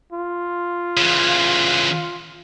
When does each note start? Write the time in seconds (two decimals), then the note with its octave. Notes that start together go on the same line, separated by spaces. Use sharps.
0.12 F4
0.97 C#3 E3